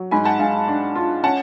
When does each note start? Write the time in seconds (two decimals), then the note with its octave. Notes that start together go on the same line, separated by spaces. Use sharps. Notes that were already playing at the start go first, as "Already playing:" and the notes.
Already playing: F#3
0.11 G#2 G#5 B5
0.25 F#5 A5
0.39 G#2 F5 G#5
0.68 D4
0.95 F4
1.23 C#4 F#5 A5